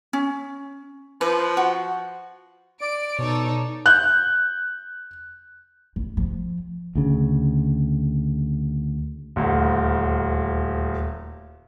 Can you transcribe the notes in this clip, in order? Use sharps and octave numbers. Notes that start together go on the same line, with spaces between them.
C#4
F3 B4
F#4
D5 D7
B2 D#4 A4 C#5
F#6 G6
A1
F3
D2 C#3
D#1 D2